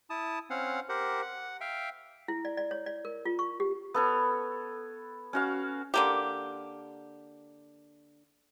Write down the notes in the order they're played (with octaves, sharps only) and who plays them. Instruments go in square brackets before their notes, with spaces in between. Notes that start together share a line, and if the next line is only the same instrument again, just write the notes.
[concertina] E4 A5 D#6
C4 C#4 F5 F#5
G4 A#4 C5 F#5
F#5
E5 F5 G5
[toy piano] E4
D5
D5
C#5
D5
A#4
F4
C#6
G4
[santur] B3 A4 C#5
C#4 F#4 F5
[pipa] D3 A#3 G4